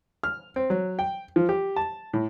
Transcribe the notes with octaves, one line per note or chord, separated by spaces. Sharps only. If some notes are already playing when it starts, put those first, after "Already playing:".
F6
C4
F#3
G5
F3
G4
A5
A2